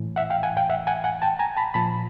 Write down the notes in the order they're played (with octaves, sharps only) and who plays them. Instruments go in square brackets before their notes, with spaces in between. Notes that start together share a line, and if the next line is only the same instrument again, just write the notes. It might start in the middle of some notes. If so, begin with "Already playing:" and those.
Already playing: [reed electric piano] A2 E3
E5 F#5
F5 G5
F#5 G#5
F5 G5
E5 F#5
F#5 G#5
F#5 G#5
G5 A5
G#5 A#5
A5 B5
A#2 F3 A5 B5